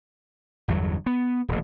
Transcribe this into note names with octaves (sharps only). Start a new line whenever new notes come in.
G1 E2 G2 F#3
B3
D#1 A1